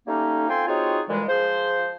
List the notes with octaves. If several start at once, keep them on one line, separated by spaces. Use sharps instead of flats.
G3 A3 A#3 C#4 D#4
C4 F4 A4 G5 G#5 C6
C4 D#4 F4 F#4 G#4 C#5
D2 A#2 E3 G3 G#3
F3 F4 G#4 C5